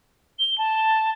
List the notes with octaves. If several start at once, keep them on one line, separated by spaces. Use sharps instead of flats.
G7
A5